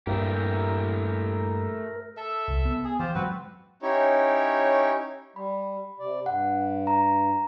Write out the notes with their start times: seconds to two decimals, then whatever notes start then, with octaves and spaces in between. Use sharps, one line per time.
0.07 G2 A#2 A3 E4 G4 A#4
2.17 A4 E5
2.48 C2
2.65 B3
2.85 G#4
2.99 E3 F4 G4 C5
3.15 G2 F#3 G#3 C4 F#4 B4
3.82 C#4 D#4 E4 G4 C#5
5.36 G3 B5
6.00 C3 D5
6.26 G2 F#5
6.87 A#5